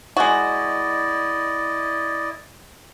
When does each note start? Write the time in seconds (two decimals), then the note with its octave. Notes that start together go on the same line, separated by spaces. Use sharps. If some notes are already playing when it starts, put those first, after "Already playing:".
0.17 G#3 E4 F#4 D5 D#5